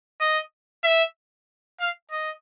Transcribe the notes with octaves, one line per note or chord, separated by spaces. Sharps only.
D#5
E5
F5
D#5